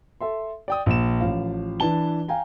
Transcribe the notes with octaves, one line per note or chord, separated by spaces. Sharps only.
A4 E5 C6
D5 G5 D#6
A#1 E7
A1 F3 F5
E3 D4 B4 A5 G7
F5 G5 G#5 A#5